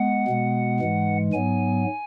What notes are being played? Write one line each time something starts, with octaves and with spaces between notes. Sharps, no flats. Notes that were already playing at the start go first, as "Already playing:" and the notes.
Already playing: G#3 B3 F#5
B2 G#3 B3
G#2 E3 G#3
G#2 F#3 B3 G#5